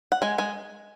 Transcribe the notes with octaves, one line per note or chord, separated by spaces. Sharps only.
F#5
G#3 G#5
G#3 G#5